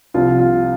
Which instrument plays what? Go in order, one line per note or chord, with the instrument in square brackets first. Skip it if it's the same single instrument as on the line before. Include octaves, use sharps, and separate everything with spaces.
[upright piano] C2 C3 F3 F4
F4